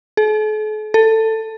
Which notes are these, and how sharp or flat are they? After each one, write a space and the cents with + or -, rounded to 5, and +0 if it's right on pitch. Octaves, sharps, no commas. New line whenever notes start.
A4 -45
A4 +15